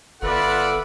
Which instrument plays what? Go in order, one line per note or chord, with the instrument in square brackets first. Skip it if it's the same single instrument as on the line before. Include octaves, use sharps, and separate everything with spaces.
[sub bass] G1 [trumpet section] F4 D5 F#5 [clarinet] A4 [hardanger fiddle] B4 E5